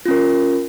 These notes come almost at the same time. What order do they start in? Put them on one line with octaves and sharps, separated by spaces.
F4 C#4 A#4